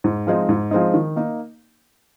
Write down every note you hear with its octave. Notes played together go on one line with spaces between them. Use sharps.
G#2
F3 G#3 C4 D#4
G#2
F3 G#3 C4 D#4
D#3
A#3 D#4